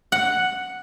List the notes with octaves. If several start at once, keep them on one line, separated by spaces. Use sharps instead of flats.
F#5